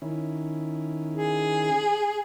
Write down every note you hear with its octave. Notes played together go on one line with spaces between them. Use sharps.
D#3 C#4 E4
G#4